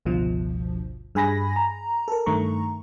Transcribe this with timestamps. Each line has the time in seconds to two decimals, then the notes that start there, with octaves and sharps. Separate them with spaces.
0.05 G1 C#2 G2 B2 F3
1.15 G2 G#4 G#5 B5 A#6
1.56 A#5
2.08 A4 A#4
2.26 G2 D#3 A3 A#5 C#6